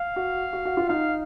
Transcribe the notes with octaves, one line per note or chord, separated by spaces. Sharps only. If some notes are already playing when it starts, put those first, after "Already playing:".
Already playing: F5
F#4
F#4
F#4
F4
D#4 F5